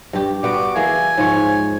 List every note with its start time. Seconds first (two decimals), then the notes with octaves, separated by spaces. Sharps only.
0.13 G2 G4
0.43 G3 B3 F#4 D6
0.76 E3 A#3 G#4 G#5
1.17 G#2 F3 C#5